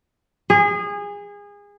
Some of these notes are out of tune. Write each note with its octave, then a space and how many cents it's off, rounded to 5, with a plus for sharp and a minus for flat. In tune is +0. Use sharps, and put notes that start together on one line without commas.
G#4 -25